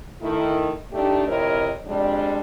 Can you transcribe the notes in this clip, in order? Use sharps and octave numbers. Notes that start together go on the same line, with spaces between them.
D#3 A3 E4
A3 D4 D#4 G4
F2 C3 E4 A#4 C#5 D#5
F2 G3 G#3 D4